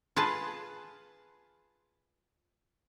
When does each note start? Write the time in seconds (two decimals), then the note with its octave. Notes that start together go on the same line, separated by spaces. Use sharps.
0.16 F4 G#4 B4 A5